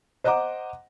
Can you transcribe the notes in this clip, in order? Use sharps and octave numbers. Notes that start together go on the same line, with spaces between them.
C5 D#5 F#5 A#5 D6